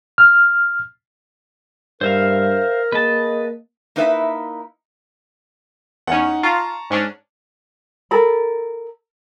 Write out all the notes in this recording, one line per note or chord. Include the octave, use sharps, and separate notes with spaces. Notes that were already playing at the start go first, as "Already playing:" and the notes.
F6
G2 A#4 C5 E5 F5
A#3 G#4 B4 D#5 A5
A#3 D#4 E4 B4 E5
E2 C#4 D#4 F#5
F4 A5 A#5 C#6
G#2 C#4 D4
A4 A#4 B5